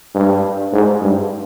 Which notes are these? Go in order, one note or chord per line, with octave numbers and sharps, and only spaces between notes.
G2
G#2
G2